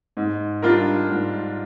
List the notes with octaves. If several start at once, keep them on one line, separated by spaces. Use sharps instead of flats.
G#2
G3 D4 F4 A#4
G#2